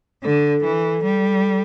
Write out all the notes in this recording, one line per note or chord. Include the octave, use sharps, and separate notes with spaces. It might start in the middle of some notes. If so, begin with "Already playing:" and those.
D3 A4
E3
G3